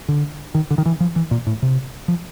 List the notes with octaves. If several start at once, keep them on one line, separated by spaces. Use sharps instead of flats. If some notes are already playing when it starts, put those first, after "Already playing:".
D3
D#3
D3
D#3
E3
F3
E3
A#2
A2
C3
F3